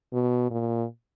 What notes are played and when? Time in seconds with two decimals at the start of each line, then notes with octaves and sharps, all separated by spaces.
0.13 B2
0.51 A#2